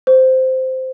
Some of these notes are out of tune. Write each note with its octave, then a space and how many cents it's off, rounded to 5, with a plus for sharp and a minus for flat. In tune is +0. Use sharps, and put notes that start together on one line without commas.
C5 -10